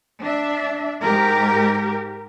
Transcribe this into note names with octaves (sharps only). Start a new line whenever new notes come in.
D4 E5
G#2 G#3 G4 A#4